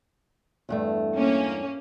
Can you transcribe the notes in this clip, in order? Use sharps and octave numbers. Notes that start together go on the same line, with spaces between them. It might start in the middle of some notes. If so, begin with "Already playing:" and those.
E2 G2 A3
A#3 C#4